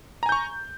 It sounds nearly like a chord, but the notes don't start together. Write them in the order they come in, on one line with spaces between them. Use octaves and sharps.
A#5 G#5 G6 C#6